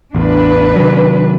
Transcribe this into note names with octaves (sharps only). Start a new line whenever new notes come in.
A1 E2 D4 B4
C3 D#3 F#3